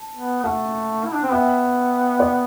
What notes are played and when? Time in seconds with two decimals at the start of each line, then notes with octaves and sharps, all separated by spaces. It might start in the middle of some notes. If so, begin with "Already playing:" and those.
Already playing: A5
0.15 B3
0.44 A3 F#5 A5
1.04 E4
1.14 D4
1.23 C4
1.31 B3 E5 G5
2.19 D5 F#5